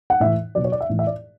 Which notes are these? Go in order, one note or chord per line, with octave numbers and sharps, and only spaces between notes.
F#5
A2 E3 E5
B2 F#3 D5
C#5
D5
E5
A2 E3
E5
D5